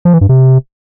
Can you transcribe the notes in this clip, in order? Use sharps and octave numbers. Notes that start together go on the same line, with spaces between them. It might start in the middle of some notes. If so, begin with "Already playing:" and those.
F3
E3
G2
C3